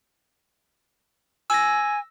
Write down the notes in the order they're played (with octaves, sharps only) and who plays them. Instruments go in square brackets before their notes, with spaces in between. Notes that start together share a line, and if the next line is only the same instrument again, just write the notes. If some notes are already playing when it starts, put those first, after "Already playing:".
[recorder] G#5 [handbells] E6 A#6